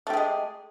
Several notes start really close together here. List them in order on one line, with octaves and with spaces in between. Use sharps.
A3 G4 G#4 G#3